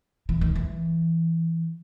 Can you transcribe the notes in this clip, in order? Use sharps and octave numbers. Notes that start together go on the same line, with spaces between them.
E3
D#3
E3